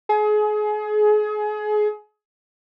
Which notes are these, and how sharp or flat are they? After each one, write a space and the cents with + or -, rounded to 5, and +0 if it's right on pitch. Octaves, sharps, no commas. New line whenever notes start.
G#4 +30